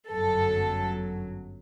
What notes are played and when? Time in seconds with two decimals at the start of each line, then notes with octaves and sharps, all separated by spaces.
0.10 G1 F#2 F#3 A4